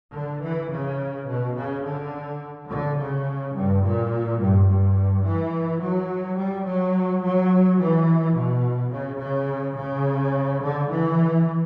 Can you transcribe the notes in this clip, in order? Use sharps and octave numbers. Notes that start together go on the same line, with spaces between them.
D3
E3
C#3
B2
C#3
D3
D3
C#3
G2
A#2
G2
G2
E3
F#3
G3
F#3
F#3
E3
B2
C#3
C#3
C#3
D3
E3